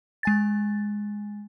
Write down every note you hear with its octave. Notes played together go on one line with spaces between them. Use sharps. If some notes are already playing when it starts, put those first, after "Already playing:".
G#3 G#5 A6